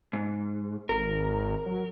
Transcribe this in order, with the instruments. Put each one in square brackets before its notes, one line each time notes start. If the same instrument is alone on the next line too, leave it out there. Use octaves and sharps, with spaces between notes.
[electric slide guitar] G#2
[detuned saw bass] G#1 [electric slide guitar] A#4
[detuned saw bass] F#3